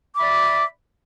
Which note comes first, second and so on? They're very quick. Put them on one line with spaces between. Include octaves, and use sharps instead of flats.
D6 B5 E5 D5